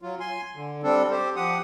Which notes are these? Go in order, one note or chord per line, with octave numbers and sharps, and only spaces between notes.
F#3 F4
G#5 C6
D3
G3 C4 D4 A4
G4 C5
F3 G4 F#5 D#6